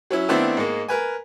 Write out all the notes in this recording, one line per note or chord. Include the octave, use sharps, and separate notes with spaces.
F#3 C#4 E4
D#3 A3 B3 C4 D4 E4
G#2 G#3 A#3
A#4 B4 G#5